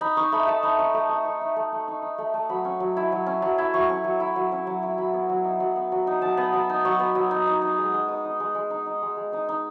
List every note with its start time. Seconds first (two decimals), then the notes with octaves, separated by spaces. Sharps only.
0.01 D#4 B5
0.17 D#4 C#6
0.32 A3 B5
0.47 A3 A5
0.63 D#4 B5
0.79 D#4 C#6
0.94 A3 D#6
1.09 A3 D#6
1.25 D#4 C#6
1.41 D#4
1.56 A3
1.72 A3
1.88 D#4
2.02 D#4
2.18 A3
2.34 A3
2.49 F#3 B5
2.65 C#4
2.80 F#3
2.97 E4
3.12 F#3
3.27 C#4
3.42 F#3
3.58 E4
3.74 F#3 C#6
3.90 C#4
4.04 F#3
4.20 E4
4.36 F#3
4.52 C#4
4.67 F#3
4.83 E4
4.98 F#3 B5
5.13 B3
5.29 F#3
5.45 D#4
5.60 F#3
5.76 B3
5.92 F#3
6.07 D#4
6.22 F#3 A5
6.37 B3
6.53 F#3 B5
6.70 D#4
6.85 F#3 C#6
6.99 B3
7.15 F#3
7.31 D#4
7.47 D#4
7.62 D#4
7.78 G#3
7.94 G#3
8.08 D#4 D#6
8.25 D#4
8.40 G#3
8.55 G#3
8.70 D#4
8.86 D#4
9.02 G#3
9.17 G#3
9.32 D#4 D#6
9.49 D#4